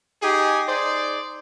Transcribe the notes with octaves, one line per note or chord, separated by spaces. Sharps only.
D#4 G4 G#4
D#4 G#4 C5 D5